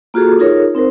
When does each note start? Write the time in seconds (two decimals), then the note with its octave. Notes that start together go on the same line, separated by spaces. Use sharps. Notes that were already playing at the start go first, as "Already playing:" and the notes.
0.14 A#3 F4 F#4 G#4 A4
0.39 D#4 F4 G#4 A#4 C#5
0.75 C4 D#4 A#4 C5